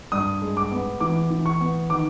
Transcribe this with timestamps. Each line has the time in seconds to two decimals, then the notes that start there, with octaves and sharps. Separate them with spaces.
0.12 G2 D#6
0.42 G#3
0.57 D6
0.71 B3
1.00 E3 D6
1.30 E3
1.46 C#6
1.61 B3
1.90 D#3 D6